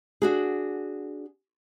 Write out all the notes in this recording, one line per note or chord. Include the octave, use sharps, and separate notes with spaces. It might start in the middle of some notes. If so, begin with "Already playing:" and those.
D4 F#4 G#4